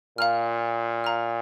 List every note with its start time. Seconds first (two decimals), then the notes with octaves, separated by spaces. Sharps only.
0.18 A#2 F5 A#5 F6
1.04 F5 A#5 F6